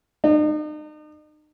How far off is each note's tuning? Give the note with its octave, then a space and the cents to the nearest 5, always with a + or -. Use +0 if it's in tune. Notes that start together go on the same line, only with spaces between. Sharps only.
D#4 -40